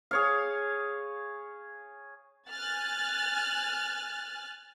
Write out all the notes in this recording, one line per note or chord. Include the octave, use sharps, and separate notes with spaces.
G#4 C#5 F5
G#5 F6 F#6 A6